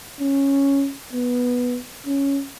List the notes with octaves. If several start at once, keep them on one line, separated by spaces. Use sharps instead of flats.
C#4
B3
C#4